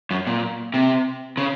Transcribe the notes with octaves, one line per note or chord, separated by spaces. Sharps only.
F#2
A#2
C3
C#3